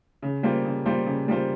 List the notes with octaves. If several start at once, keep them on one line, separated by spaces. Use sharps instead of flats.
C#3
G3 A#3 F4 C5
C#3
G3 A#3 F4 C5
C#3
G3 A#3 F4 C5